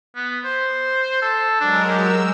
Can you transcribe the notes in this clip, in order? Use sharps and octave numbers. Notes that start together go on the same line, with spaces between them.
B3
C5
A4
F#3 G#3 D4 A#4
G4 E6